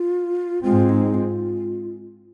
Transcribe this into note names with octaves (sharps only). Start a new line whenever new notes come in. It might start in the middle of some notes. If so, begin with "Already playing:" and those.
Already playing: F4
G#2 G#3 C4 F4
D#4
F4